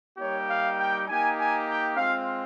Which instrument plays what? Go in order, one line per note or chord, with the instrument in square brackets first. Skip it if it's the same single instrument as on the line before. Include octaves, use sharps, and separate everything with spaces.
[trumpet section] G3 A#3 D#4 G4 C#5
F5
G5
A#3 D#4 G4 G#5
G#5
G5
G#3 C4 F4 F5